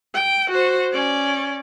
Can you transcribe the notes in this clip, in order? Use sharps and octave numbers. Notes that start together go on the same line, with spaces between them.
G5
F#4 C5
C#4 D5